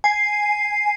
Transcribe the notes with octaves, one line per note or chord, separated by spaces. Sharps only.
G#5 C7